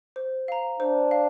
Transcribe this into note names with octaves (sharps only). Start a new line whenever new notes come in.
C5
F5 A#5
D4 C5
F5